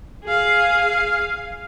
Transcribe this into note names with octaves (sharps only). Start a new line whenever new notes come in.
G#4 F5